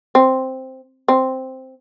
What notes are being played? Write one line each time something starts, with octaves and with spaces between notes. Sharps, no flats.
C4
C4